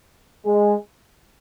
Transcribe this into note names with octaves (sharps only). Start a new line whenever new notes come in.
G#3